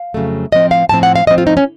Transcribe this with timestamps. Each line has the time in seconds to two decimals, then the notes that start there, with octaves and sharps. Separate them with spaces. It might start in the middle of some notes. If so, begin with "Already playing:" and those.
Already playing: F5
0.14 F2 C#3 F#3 A3
0.52 A2 F3 C4 D#5
0.71 F5
0.89 A2 F3 C4 A5
1.03 F#5
1.16 F5
1.27 A2 F3 C4 D#5
1.38 F4
1.47 D#4
1.57 C#4